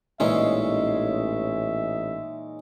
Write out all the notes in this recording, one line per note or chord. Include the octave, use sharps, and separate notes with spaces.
A1 A#2 E3 G#3 C#4 D#4 C#5 E5